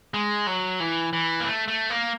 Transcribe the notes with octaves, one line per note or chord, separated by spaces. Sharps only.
G#3
F#3
E3
E3
A#3
A3
A3
A#3